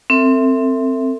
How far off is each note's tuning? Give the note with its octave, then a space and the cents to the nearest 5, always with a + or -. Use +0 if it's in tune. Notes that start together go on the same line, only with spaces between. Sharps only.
C4 +0 A4 +40 E5 +0